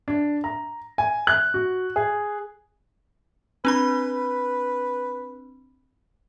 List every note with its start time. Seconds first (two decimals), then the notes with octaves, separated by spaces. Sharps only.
0.08 D4
0.44 A#5
0.98 G#5
1.27 F#6
1.54 F#4
1.96 G#4
3.65 C4 D4 B4 B5